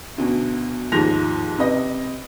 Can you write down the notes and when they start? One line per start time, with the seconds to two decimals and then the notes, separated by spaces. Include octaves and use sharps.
0.18 D2 B2
0.92 D#2 G#2 F3 A#6 F7
1.59 C3 B4 D#5 A#6